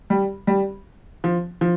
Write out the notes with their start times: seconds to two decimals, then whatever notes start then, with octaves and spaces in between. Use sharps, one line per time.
0.10 G3
0.47 G3
1.24 F3
1.61 F3